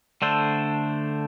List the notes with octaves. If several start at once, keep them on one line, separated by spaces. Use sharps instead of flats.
D3 A3 D4 A4 C5